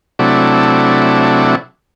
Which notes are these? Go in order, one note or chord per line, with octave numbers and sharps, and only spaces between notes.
C3 F#3 A3 D4 E4